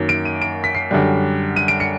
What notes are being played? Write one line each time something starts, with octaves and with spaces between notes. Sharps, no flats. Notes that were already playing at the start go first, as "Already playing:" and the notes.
Already playing: F#2 D#3 F#3 A#3
D7
D#7
D7
B6
C7
F#2 D3 G3
D#7
D7
C#7